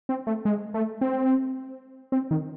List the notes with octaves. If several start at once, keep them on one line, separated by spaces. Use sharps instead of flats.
C4
A3
G#3
A3
C4
C4
D#3